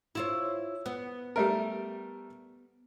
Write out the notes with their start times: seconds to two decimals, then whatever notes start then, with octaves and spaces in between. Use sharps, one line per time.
0.15 E4 F4 C#5
0.86 B3
1.36 G3 A3 A#4